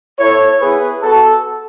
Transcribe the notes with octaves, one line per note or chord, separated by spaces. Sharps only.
B3 E4 A4 C#5
B3 E4 G#4 B4
B3 F#4 A4